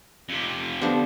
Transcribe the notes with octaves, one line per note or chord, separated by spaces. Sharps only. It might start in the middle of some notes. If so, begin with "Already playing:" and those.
F2 C3
D3 F3 B3 G4